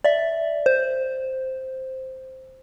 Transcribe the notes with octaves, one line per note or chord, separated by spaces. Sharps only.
D5 E5
C5